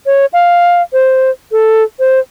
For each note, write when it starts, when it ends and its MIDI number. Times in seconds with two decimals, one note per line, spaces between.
0.06 0.26 73
0.33 0.82 77
0.93 1.30 72
1.52 1.83 69
1.99 2.19 72